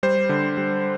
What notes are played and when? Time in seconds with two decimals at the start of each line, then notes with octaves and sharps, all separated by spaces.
0.03 G3 C5
0.29 D3
0.57 G3